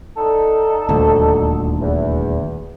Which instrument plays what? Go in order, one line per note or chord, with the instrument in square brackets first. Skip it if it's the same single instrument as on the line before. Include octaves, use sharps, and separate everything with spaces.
[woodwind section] D3 D#4 A4
[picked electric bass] D#1 D2
[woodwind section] E2